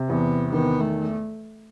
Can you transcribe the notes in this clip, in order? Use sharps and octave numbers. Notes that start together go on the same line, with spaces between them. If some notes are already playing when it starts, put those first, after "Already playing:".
Already playing: C3
E2 B3
D#3 B3
A3